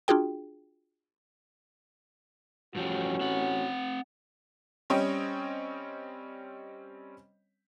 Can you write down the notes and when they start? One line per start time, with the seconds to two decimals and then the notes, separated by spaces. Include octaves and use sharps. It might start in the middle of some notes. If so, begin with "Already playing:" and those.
0.08 D4 F4 F#4 G#4 G5
2.75 A1 G2 F3 C#4 F#4 G4
3.21 C4 F#5
4.90 G3 C4 C#4 C#5 D#5 G5